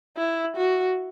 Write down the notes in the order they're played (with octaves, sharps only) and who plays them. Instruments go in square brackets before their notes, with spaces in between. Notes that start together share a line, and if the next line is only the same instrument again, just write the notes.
[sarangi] E4
F#4